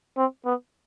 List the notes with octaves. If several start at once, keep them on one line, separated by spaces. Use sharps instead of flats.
C4
B3